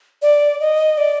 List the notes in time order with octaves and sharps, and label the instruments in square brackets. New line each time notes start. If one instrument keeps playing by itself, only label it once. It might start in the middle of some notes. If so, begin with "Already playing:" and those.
[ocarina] D5
D#5
D5